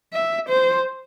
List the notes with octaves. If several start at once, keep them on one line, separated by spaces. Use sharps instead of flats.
E5
C5